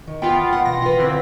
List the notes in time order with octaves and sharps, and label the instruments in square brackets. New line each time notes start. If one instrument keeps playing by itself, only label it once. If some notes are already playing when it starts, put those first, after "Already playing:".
[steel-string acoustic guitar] D#3
[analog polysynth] B3 F4 [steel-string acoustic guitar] G5
[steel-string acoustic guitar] G2 F#5
[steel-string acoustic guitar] B2 E3 [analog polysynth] A#6
[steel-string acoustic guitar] F4 B4
[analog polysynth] D3 E3 C4